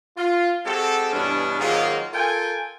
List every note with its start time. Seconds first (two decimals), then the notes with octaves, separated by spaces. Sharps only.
0.17 F4
0.66 G#3 C4 F#4 G4 A4
1.12 G2 B2 E3 C#4 D4
1.59 G#2 D#3 F#3 G#3 A#3 F4
2.13 F4 A4 A#4 G5 G#5